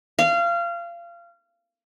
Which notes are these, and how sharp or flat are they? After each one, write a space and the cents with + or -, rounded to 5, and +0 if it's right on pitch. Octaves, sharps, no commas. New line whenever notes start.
F5 -25